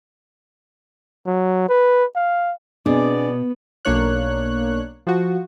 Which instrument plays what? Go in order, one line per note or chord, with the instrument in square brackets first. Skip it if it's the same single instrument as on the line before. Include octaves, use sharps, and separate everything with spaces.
[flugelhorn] F#3
B4
F5
[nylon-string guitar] B2 [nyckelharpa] B3 [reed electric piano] C4 D4 [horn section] G#4 D5
[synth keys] B1 A#3 D4 C#5 F#6
F3 F#4